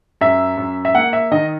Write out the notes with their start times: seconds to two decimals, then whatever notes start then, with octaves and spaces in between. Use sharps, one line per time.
0.21 F#2 E5
0.57 F#2
0.85 E5
0.95 A#3 F#5
1.13 E5
1.31 D#3 D#5